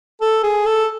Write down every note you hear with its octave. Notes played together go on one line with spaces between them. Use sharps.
A4
G#4
A4